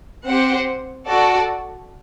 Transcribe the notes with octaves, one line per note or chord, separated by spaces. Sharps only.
C4 G4 C5 F#5
F#4 A4 D5